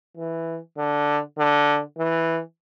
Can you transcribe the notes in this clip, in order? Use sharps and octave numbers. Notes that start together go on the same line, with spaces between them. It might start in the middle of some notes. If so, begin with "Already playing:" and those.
E3
D3
D3
E3